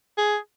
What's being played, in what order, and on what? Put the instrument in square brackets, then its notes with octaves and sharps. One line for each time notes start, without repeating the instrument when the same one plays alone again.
[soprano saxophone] G#4